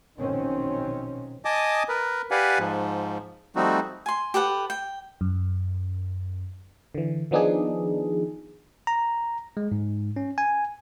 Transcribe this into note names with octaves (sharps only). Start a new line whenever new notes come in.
A#1 B2 D#3 F#3 C4 C#4
D#5 G#5 A5 D6 D#6
A#4 B4
G4 B4 D5 F5 F#5 G#5
G#2 F3
F3 G3 A3 C4 D#4 F#4
G#5 C6
G4 A4 B4 F#5
G5
F#2
D3 E3
D#3 F3 B3 D4 D#4 G#4
A#5
G#3
G#2
C#4
G#5